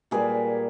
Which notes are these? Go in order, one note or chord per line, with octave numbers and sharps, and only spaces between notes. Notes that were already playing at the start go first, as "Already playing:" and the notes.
A#2 G3 A#3 G#4 B4